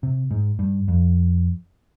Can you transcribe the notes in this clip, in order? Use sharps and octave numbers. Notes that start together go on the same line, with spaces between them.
C3
G#2
G2
F2